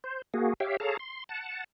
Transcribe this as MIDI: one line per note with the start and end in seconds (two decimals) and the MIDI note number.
0.04 0.22 72
0.34 0.53 58
0.34 0.53 66
0.34 0.53 68
0.60 0.77 67
0.60 0.77 73
0.60 0.77 76
0.60 0.77 77
0.60 0.77 79
0.80 0.97 68
0.80 0.97 69
0.80 0.97 73
0.80 0.97 77
0.80 0.97 81
0.80 0.97 82
0.99 1.24 84
1.29 1.64 78
1.29 1.64 81